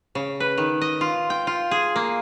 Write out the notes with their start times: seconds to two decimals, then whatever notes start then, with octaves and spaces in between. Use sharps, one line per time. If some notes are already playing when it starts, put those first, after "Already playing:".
0.15 C#3
0.40 B4
0.58 D#3
0.81 D#5
1.01 F4
1.30 G5
1.47 F4
1.71 G#4
1.96 A#3